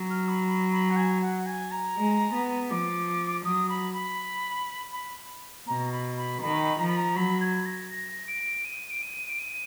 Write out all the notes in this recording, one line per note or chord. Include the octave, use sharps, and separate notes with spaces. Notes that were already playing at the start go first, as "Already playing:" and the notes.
Already playing: F#3
F6
B5
B5
B5
F#5
G#5
F#5
G#5
A#5
G#3
B3
F3 D6
F#3 D#6
B5
B5
B5
B2 A#5
B5
B5
D#3 B5
F3 A#5
B5
A#5
F#3 B5
G#6
A#6
A#6
D7
D#7
D7
D#7
D7
D#7